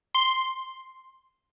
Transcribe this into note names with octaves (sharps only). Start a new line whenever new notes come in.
C6